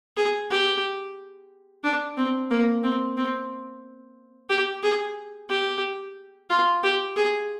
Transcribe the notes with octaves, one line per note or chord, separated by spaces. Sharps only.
G#4
G4
D4
C4
A#3
C4
C4
G4
G#4
G4
F4
G4
G#4